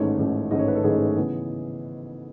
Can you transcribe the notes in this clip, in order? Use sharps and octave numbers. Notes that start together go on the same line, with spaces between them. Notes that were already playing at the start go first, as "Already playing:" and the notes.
Already playing: A1 G#2 D#3 A3 C#4 C#5
A1 G#2 D#3 A3 C#4
A1 G#2 D#3 A3 C#4 D#5
C#5
B4
A4
A1 G#2 D#3 A3 C#4 G#4
C#3 E3 B3